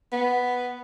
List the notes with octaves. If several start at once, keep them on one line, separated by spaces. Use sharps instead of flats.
B3